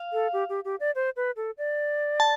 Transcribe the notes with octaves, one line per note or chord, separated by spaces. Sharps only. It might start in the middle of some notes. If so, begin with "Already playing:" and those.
Already playing: F5
A4
G4
G4
G4
D5
C5
B4
A4
D5
A5